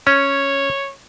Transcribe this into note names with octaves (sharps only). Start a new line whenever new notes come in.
C#4 C#5